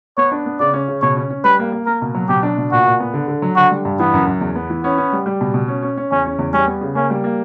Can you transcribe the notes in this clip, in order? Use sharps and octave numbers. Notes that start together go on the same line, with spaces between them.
B3 C#5
D4
B3
C#3 D5
C#4
C#3
B2 C#5
C#4
C#4
G3 B4
A#3
A#3
A#3 A#4
B2
F#3
B2 G4
D4
B2
A#2 F#4
A#2
B3
D3
D3
F#3
D3 F#4
G3
G2
E3 B3
F#2
F#2
E2
B3
E3
B3 C#4
C#4
G3
G3
B2
B2
C#4
C#4
C#4
E2 C#4
C#4
E2
G3 C#4
B3
C#3
A#3 C#4
G3
A#3